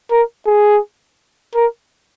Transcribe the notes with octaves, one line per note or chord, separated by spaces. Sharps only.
A#4
G#4
A#4